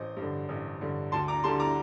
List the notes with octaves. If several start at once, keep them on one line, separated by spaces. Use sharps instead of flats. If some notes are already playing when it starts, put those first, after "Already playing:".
Already playing: A1 C5 D#5
G2
D3
A1
G2 D3
D2 A5 C6
A#5 D6
D3 G3 A5 C6
A#5 D6